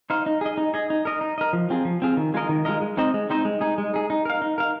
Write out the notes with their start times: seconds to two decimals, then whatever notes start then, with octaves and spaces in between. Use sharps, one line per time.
0.10 D#4 C5 F5
0.26 D#4
0.41 G#4 D#5
0.57 D#4
0.74 G#4 D#5
0.90 D#4
1.05 A#4 D#5
1.21 D#4
1.38 A#4 D#5
1.53 F3
1.70 C4 F4 G#4
1.85 F3
2.02 C4 F4 G#4
2.17 D#3
2.34 G#3 F4 A#4 D#5
2.49 D#3
2.65 G#3 F4 A#4 D#5
2.81 G#3
2.97 C4 D#4 C5 D#5
3.14 G#3
3.30 C4 D#4 C5 D#5
3.45 G#3
3.61 D#4 G#4
3.78 G#3
3.94 D#4 G#4
4.10 D#4
4.25 A#4 F5
4.42 D#4
4.58 A#4 F5